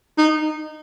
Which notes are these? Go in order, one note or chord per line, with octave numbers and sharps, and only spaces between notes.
D#4